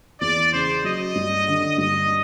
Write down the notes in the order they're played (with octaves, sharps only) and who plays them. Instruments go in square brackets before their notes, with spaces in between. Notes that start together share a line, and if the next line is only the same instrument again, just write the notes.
[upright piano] E2 [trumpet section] D5
[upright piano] C#3 [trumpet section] C5
[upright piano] F#3 [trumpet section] D#5
[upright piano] G2
D3
[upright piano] G2 [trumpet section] D#5